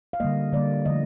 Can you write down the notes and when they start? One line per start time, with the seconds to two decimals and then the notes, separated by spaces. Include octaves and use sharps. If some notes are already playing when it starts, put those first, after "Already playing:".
0.13 F5
0.20 D3 G3 A#3 D#5
0.52 D3 G3 A#3 D5
0.85 D3 F3 A3 D#5